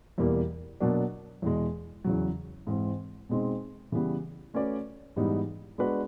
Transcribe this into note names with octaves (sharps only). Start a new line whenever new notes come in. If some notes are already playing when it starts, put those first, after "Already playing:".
E2 B2 G3 A#3
B2 F#3 A#3 D4 F#4
E2 B2 G#3
E2 C#3 F#3
G#2 E3 G#3 C4
B2 G#3 C4 D#4
C#3 E3 G3 B3
A3 C#4 F#4 B4 D5
G#2 E3 G3 B3 D#4
G#3 B3 D4 F#4 B4